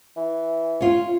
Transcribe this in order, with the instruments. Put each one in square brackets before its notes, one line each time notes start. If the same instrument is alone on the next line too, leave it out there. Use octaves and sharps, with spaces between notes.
[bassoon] E3
[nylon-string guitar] C#4 F4